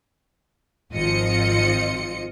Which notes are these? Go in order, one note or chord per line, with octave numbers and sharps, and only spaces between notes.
G#1 F3 C4 F4 D#5 C#7